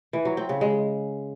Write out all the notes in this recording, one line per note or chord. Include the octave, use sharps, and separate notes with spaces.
E3
F#3
C4
C#3
G#3